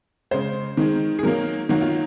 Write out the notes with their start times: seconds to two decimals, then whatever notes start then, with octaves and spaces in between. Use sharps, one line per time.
0.31 C#3 G#3 C5
0.77 D#3 G#3
1.19 G#4
1.23 D#3 F#3 A#3 A#4
1.69 D#3 F#3 A#3 F#4
1.82 F4